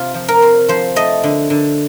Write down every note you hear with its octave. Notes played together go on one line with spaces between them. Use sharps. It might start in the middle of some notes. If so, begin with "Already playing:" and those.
Already playing: C3 F4
F3
A#4
C4
F3 C5
A3 D#5
D3
D3